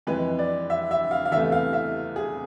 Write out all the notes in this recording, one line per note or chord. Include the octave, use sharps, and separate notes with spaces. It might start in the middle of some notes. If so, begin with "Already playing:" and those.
F2 E3 G#3 B4
D5
E5
E5
F5
F5
E2 C3 E3 A3 E5
F5
E5
G#4